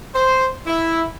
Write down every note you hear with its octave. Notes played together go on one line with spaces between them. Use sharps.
C5
E4